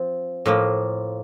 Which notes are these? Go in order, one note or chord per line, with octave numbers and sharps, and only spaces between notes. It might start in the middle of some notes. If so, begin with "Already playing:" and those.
Already playing: F3 C4
A2 F3 A#3